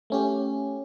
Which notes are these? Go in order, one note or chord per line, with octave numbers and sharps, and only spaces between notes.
A3 C#4 G4